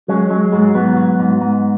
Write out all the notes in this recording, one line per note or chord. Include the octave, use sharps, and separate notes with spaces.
F#3 G#3 C#4
F#3 G#3
G#2 G#3
G#2 F#3 B3
F#3
G#2
G#2